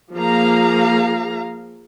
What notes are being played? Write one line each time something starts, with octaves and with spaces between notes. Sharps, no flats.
F3 A#3 G#4 F5 A#5